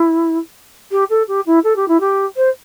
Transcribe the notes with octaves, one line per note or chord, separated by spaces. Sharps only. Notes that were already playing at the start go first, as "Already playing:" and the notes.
Already playing: E4
G4
A4
G4
E4
A4
G4
E4
G4
C5